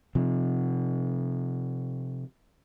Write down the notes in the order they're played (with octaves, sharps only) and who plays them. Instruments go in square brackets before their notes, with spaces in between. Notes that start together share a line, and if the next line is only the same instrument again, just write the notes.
[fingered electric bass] C3 F3